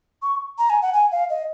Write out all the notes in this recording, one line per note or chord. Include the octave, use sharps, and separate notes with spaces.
C#6
A#5
G#5
F#5
G#5
F5
D#5